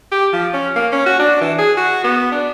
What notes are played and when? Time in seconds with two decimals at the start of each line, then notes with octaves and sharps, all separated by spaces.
0.12 G4
0.33 F3
0.53 C#4
0.76 A#3
0.92 C#4
1.06 F#4
1.20 D4
1.41 E3
1.59 G#4
1.77 F#4
2.04 B3
2.31 D4